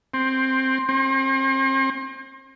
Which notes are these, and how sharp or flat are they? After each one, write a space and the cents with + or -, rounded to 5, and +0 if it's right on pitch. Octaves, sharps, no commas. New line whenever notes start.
C4 +10
C4 +40